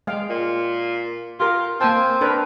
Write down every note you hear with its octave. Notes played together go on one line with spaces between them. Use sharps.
G#3 F5 G5
A#2
F4 G4 A#4
A#3 C4 G#5 A5
D4 A#4 B4